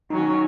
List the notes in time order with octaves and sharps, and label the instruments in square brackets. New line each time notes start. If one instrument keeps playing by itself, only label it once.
[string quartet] D#3 F#3 C#4 [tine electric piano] D#4